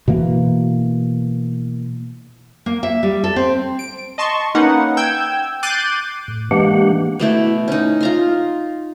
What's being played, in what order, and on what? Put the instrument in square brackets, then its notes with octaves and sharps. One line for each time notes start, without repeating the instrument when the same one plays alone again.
[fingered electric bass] B2 E3 A#3
[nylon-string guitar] A#3
E5
G3
A4
C4
[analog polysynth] D7
D#5 A5 C6 C#6
A#3 C#4 D#4 B4 F#5
G5 E6 G6 G#6
D6 F#6 G6 A6 C7 D#7
[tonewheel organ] A2
E3 G#3 A#3 D4 G4 F#5
[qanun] B2 A3 E4
C#4 D#4
F4 A#5 C6